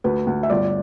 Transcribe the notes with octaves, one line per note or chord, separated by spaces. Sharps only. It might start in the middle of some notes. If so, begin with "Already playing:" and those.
D2 B4
D2
E5
G1 D5